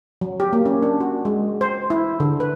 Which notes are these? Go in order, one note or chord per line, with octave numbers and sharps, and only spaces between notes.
F#3
G4
A#3
C#4
D4
F#4
G#3
C5
E4
D3
B4